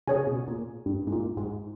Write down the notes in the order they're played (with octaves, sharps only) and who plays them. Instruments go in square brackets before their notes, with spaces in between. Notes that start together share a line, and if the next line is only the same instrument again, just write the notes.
[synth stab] C#3 [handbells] G#4 C#5 G#5
[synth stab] B2
A#2
G2
G#2
A#2
G#2